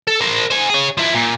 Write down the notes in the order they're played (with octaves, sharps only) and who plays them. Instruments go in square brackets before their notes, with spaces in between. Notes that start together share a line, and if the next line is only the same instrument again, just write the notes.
[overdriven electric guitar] A4
A#4 C5
C5 G#5
G#4 C#5
F3 E4
A#2